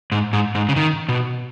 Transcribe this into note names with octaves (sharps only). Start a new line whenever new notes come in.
G#2
G#2
G#2
C#3
D#3
B2